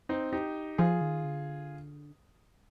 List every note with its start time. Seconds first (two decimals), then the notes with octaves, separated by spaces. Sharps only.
0.09 C4 D#4
0.33 D#4 G4
0.78 F3 F4 G#4
1.01 D#3
1.25 D3